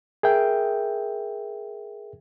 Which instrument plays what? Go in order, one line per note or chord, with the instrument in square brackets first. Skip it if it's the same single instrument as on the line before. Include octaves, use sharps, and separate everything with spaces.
[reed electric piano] G#4 A#4 E5 G5